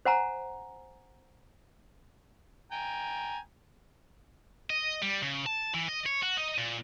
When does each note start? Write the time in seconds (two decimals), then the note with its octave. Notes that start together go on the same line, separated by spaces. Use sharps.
0.06 C5 F#5 G#5 A#5
2.72 G5 G#5 A#5
4.70 D#5
5.02 G3
5.23 C#3
5.46 A5
5.74 E3
5.89 D#5
6.06 C#5
6.23 F#4
6.37 D#4
6.58 A#2